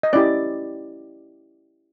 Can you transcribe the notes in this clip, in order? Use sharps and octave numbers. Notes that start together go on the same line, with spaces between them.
D#5
C#4 E4 G4 D5